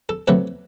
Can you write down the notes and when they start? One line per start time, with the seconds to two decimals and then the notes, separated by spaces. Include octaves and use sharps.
0.09 A4
0.28 C3 F#3 A3 B4